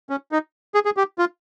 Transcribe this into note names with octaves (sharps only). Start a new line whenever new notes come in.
C#4
D#4
G#4
G#4
G4
F4